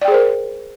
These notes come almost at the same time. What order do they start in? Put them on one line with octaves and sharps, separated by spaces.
D5 G5 G#4 C5 A#4